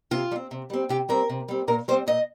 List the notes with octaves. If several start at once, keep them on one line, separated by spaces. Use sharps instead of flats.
C3 F4
G3
C4
C3
G3 C4
C3 G4
G3 C4 A#4
C3
G3 C4
A#2 A#4
G3 C4 C5
A#2 D#5